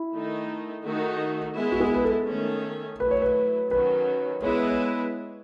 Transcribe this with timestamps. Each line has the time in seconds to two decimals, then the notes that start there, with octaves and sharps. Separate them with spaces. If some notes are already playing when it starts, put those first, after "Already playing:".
Already playing: E4
0.13 D#3 A3 D#4
0.85 D#3 A3 D#4 F#4
1.56 G#3 B3 E4
1.72 F#4
1.80 G#4
1.94 B4
2.04 A4
2.28 D#3 A3 C#4
3.00 F#3 A3 E4 B4
3.11 C#5
3.22 B4
3.71 D#3 F#3 C#4 F#4 B4
4.43 G#3 B3 E4 B4 C#5
4.69 C#5